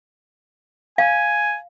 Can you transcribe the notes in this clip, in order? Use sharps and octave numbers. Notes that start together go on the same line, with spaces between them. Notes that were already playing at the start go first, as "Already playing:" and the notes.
F5 G#5